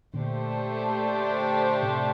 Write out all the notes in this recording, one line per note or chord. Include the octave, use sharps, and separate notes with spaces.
A#2 D3 A3 D4 G4 C5
A2 C3